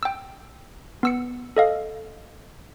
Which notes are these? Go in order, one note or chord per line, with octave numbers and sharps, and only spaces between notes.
G5 E6
B3 E6 C#7
A4 D#5 F5